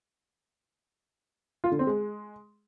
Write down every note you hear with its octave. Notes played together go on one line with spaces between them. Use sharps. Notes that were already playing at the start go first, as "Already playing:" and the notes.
F4
D3
C4
G#3